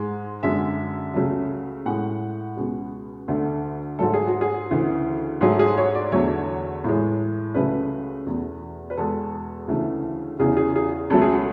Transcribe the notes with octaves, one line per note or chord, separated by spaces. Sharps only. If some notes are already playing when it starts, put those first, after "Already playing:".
Already playing: G#2 G#3
F#2 D3 G#3 E5
C#2 C#3 F#3 A3
A2 G#3 F#5
C#2 B2 G#3
D2 D3 A3 A4
G#2 F#3 A3 A4
G#4
F#4
G#4
D2 C#3 E3
G#2 F#3 A3 G#4
G#4
C#5
D5
E2 D3 F#3 A3 C#5
A2 E3 G#3
C#2 C#3 F#3 A3 B4
E2 B2 A3
B4
E2 B2 G#3 A4
D2 C#3 E3 A3
E2 C#3 E3 G#4
G#4
G#4
C#2 B2 F#3 A3 A4
G#4
F#4